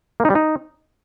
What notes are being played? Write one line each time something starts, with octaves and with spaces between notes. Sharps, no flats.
A#3
D#4
G3
D#4